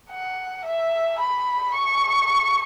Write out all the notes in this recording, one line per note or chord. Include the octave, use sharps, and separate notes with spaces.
F#5
E5
B5
C#6